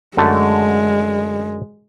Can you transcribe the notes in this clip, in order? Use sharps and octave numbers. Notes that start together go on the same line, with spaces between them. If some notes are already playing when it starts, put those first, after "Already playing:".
F#2 D3 G#3 A3